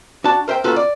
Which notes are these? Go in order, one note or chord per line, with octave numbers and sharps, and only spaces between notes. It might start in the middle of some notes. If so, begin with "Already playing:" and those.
D4 F#4 A5
A#4 C5 E5 G5
A#3 C#4 F4 F#4 A4 B4
D5